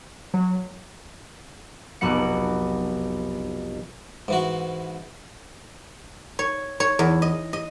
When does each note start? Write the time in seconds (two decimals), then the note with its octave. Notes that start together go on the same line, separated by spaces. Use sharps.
0.34 F#3
2.01 F1 B1 B2 B3 F#5 C#7
4.28 G#2 E3 F#4
6.39 C#5
6.80 C#5
6.99 E2
7.22 D#5
7.53 D#5